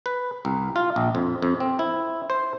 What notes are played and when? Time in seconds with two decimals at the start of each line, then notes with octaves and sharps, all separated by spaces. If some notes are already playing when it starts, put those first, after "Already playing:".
0.06 B4
0.45 C2
0.76 F4
0.96 A#1
1.15 F2
1.42 F2
1.60 C4
1.79 E4
2.30 C5